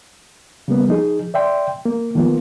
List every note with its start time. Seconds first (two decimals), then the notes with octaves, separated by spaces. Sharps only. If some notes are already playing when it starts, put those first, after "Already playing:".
0.68 C#3 G3 A#3 B3
0.88 F3 D#4 G#4
1.34 D5 E5 G5 C6
1.85 A#3
2.15 D#3 F3 A#3 B3 F4